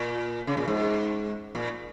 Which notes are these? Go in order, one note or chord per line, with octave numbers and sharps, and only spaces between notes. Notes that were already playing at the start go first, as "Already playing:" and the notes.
Already playing: A#2
C#3
A#2
G#2
A#2